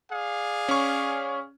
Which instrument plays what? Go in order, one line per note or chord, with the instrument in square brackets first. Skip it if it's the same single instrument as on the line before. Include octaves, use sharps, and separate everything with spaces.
[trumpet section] G#4 D5 F5
[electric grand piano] C#4 C#6